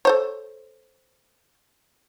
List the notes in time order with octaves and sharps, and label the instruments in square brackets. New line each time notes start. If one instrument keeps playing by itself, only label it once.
[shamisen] A4 C5 C#5